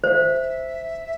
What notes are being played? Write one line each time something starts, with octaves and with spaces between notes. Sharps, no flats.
C5 F5
E5